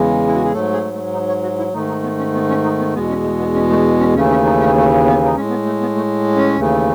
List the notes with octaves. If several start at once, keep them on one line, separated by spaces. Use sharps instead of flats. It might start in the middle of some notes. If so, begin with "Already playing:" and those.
Already playing: E2 C#3 E3 G#3
E4
F#4
G#4
G#2 F#3 A3 A4
G#4
A3
D#4
C#5
F#4
E4
G#2 D#3 A3 D#4
D#4
B3
C#4
B3
C#4
D#4
B3
E2 B2 G#3 B3
C#4
A3
B3
C#4
A3
C#4
D#2 C#3 E3 A3 C#4
C#4
D#4
C#4
A3
B3
D#4
A2 G#3 C#4
B3
A3
B3
A3
C#4
D#2 C#3 E3 A3